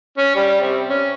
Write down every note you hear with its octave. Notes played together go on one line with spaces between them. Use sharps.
C#4
G3
C3
C#4